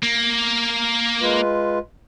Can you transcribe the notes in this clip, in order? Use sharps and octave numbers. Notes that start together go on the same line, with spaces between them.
A#3
G#3 F4 B4